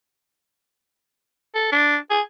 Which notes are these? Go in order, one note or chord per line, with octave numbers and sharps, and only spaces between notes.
A4
D4
G#4